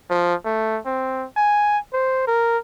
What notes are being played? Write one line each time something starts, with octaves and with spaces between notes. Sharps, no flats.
F3
A3
C4
G#5
C5
A#4